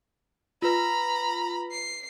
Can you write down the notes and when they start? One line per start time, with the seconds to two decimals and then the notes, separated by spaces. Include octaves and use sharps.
0.62 F4 B4 A#5 B5
1.71 C7